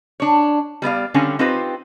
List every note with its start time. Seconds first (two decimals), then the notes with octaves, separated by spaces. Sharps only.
0.20 D4 C#5
0.82 G3 B3 D5 F5
1.14 D3 G3 C4 C#4 F5 G#5
1.39 C4 D#4 F4 G4 B4 C5